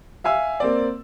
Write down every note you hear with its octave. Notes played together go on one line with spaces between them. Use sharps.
E5 F5 G#5 E6
A#3 C4 D5